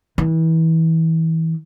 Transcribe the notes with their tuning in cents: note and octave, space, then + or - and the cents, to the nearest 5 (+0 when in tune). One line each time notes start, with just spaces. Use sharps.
E3 -30